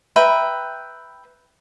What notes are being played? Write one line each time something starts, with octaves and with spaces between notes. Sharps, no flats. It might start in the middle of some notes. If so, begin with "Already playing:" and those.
B4 E5 G5 A#5